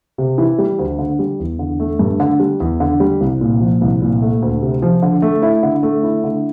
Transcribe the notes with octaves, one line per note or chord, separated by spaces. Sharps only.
C3
E3
G3
D2
D3
G3
E2
D3
A3
G2
D3
G3
E2
D3
G3
C2
A#2
F3
C2
A#2
A3
D2
C3
F3
D3
A3
E4
D3
A3
E4
D3